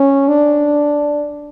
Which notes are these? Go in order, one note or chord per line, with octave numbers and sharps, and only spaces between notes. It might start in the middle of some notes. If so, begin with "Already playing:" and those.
Already playing: C#4
D4